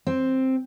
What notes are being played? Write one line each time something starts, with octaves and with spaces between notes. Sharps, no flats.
C4